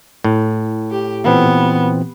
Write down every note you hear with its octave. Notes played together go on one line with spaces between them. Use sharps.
A2
G4
A#2 E3 B3 C4